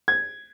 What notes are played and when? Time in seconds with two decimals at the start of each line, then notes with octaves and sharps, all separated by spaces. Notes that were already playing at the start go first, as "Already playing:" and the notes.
0.08 G#6